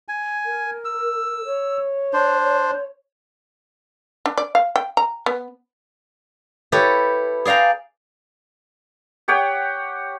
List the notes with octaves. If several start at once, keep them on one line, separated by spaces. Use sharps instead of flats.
G#5
A#4
E6
C#5
D4 C5
D4
D5
F5
G5
A#5
B3
E4 G4 A4 B4 C#5
G#4 D5 F5 G5 A#5
G4 C#5 F#5 G5